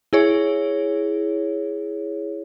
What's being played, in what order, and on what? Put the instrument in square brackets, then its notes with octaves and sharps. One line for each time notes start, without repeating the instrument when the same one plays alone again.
[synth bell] E4 G#4 C#5